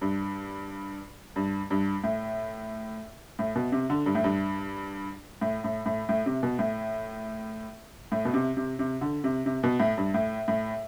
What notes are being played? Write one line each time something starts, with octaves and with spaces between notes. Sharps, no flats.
G2
G2
G2
A2
A2
B2
C3
D3
G2
A2
G2
A2
A2
A2
A2
C3
B2
A2
A2
B2
C3
C3
C3
D3
C3
C3
B2
A2
G2
A2
A2